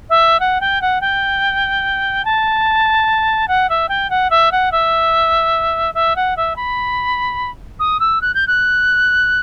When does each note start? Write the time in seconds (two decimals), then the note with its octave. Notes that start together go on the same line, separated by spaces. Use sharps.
0.09 E5
0.39 F#5
0.60 G5
0.81 F#5
1.01 G5
2.24 A5
3.47 F#5
3.69 E5
3.88 G5
4.09 F#5
4.30 E5
4.51 F#5
4.71 E5
5.94 E5
6.15 F#5
6.36 E5
6.56 B5
7.79 D#6
7.99 E6
8.21 F#6
8.34 G6
8.47 F#6